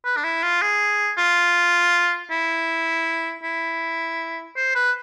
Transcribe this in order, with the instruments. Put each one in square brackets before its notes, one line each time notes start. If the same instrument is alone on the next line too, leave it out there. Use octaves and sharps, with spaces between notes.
[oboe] B4
D4
E4
F4
G#4
F4
E4
E4
C5
B4